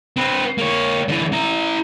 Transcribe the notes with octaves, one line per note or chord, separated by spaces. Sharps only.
C4 B4
A#3 C#5
D3 E3
E4 A#5